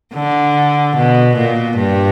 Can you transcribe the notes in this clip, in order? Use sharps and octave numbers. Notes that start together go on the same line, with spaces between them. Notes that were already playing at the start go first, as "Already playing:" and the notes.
D3
B2
A#2
G2